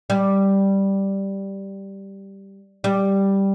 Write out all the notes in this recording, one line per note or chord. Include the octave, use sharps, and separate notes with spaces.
G3
G3